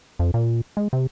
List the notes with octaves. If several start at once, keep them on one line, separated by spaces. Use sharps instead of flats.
F2
A#2
G#3
C3